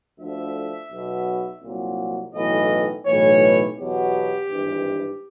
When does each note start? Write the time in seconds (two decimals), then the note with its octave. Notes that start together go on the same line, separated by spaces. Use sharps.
0.19 D2 D3 F3 E5
0.91 B1 B2 F#3
1.63 C2 A#2 F#3
2.34 B1 A2 E3 D#5
3.06 B1 A2 E3 C#5
3.78 E2 B2 F#3 G4
4.50 G#1 G2 E3